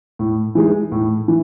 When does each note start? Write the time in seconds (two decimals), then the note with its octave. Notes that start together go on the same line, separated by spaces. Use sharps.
0.19 A2
0.55 E3 G#3 D#4
0.92 A2
1.28 E3